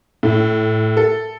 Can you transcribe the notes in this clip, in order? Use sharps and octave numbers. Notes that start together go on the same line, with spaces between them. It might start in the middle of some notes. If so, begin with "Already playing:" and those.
A2
A4